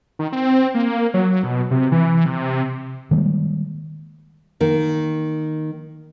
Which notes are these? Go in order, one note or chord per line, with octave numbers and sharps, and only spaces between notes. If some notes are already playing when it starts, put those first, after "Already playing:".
D#3
C4
A#3
F#3
B2
C3
E3
C3
D#3 G3 G#3 A#3
D#3 A#3